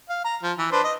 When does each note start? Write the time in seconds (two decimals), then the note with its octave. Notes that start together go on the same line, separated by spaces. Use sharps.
0.10 F5
0.24 A#5
0.42 F3
0.58 E3
0.72 D4 B4 C5
0.83 D#5